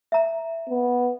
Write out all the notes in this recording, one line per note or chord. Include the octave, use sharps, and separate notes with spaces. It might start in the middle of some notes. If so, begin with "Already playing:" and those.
E5 A#5
B3